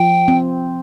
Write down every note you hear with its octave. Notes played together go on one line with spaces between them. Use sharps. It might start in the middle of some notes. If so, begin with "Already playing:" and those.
Already playing: F3 G5
C4